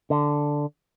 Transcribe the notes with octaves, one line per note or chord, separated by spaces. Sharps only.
D3